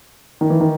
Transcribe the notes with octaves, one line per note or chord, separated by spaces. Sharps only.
D#3
E3
D#3